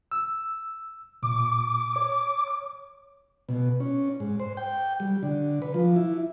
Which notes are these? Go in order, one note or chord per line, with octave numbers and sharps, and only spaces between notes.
E6
A#2 D6
C#5
B2
C#4
G#2
C5
G5
G3
D3
B4
F3
E4